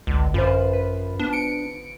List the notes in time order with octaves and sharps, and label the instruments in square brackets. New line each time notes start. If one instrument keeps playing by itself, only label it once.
[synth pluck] G#1 D3 [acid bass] C#2
[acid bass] F#2 [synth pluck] F4 B4 C5
[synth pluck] B4
[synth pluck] B3 [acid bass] D4
[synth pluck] C#7 D7